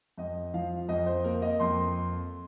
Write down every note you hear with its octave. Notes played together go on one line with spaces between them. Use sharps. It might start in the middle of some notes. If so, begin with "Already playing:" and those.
F2 D#5
F3 F5
F2 D#5
C5
A#3 A#4
D#5
F2 C6